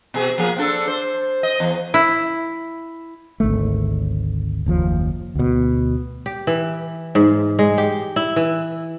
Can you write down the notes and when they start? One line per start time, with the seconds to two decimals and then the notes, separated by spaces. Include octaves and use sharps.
0.14 B2 G#4
0.38 F3 A#3 G#4
0.56 C4 D4 A4
0.88 C5
1.43 D#5
1.60 E2
1.94 E4
3.40 G#1 D2 A3
4.66 F#1 D#2 F3
5.35 D2 B2
6.26 G4
6.47 E3
7.15 G#2
7.59 G#3
7.78 G4
8.16 E4
8.36 E3